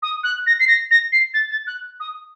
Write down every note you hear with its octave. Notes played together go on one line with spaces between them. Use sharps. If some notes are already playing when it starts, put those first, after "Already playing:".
D#6
F#6
A#6
C7
A#6
A#6
C7
A6
A6
F#6
D#6